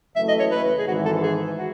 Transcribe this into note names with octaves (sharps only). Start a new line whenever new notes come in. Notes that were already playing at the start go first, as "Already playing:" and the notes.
F#1 F#2 E3 A3 E4 E5
D#5
C#5
B4
G#4
G#1 G#2 E3 F#4
A4
G#4
F#4